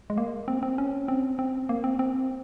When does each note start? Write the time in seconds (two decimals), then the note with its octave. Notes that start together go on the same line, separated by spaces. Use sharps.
0.10 G#3
0.18 A#3
0.48 C4
0.63 C4
0.78 C#4
1.08 C4
1.39 C4
1.69 A#3
1.84 C4
1.99 C4